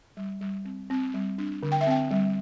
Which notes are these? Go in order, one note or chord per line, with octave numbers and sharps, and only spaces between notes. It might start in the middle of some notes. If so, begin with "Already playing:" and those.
G3
G3
C4
C4
G3
D4
D3
G5
E5
C4 G5
G3